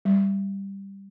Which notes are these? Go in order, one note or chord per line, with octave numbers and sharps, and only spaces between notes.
G3